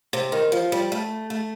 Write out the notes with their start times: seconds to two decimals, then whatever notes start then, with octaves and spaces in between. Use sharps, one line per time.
0.13 C3
0.32 D#3
0.52 F3
0.72 G3
0.92 A3
1.30 A3